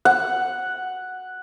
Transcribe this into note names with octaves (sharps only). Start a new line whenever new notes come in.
F#5